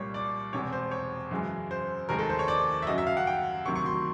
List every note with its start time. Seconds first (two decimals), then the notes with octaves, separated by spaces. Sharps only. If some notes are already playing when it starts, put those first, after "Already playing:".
Already playing: C2 A#2 G3 C#5
0.14 D5
0.53 E1 E2 C3 C#5
0.72 C5
0.91 C#5
1.31 F#2 C#3 E3 G#3
1.71 C5
2.09 F1 D#2 D#3 G#3 A#4
2.19 A4
2.29 C5
2.39 C#5
2.48 D5
2.82 E5
2.87 F#2 C#3 F#3 D#5
2.98 E5
3.07 F5
3.17 F#5
3.27 G5
3.66 D2 C3 D#3 F#3 C#6
3.76 C#6
3.86 C6